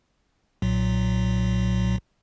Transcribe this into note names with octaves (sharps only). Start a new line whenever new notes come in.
B1 A#2 F#3